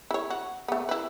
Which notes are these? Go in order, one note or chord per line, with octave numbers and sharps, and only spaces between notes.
E4 C#5
F#4
A3 B3
E4 B4